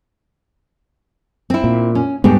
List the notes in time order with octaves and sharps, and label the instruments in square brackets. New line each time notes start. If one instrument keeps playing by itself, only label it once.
[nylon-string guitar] C4 E4
[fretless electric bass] A#2
[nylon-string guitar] C#4
[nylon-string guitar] D2 G#2 G4 [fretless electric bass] G3 G#3 B3